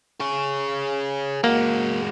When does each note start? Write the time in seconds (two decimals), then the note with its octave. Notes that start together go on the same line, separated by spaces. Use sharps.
0.20 G#4 C#5
1.44 G#3 A#3 F#4